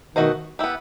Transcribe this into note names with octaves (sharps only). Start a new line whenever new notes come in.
B2 D#3 A3 D#4 F#4 C5 D#5
B3 E4 G4